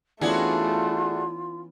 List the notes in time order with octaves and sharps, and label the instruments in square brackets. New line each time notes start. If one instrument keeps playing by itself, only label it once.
[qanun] E3 B3 C#4 [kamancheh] A3 [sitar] D4 F#4 G#4 [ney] F4